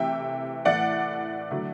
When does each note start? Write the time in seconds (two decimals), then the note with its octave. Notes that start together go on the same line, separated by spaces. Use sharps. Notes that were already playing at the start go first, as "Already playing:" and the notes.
Already playing: C3 E3 A3 E5 G5
0.65 A2 E3 A3 D5 F#5
1.51 D3 F#3 A3